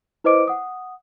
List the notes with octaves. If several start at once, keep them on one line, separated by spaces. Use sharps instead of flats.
E4 B4 C5 D#5 D6 D7
F#5 D#6